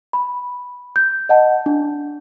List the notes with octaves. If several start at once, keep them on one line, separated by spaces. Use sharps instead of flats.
B5
G6
D#5 F#5 A5
D4